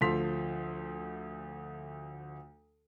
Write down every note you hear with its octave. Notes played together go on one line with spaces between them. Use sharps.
D2 F3 A4 C6 B6 F7